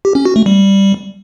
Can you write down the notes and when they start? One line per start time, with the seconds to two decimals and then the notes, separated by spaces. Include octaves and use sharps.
0.05 G4
0.15 C#4
0.25 F#4
0.36 A3
0.46 G3